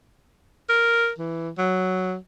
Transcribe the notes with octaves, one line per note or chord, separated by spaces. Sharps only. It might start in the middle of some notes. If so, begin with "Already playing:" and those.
A#4
E3
F#3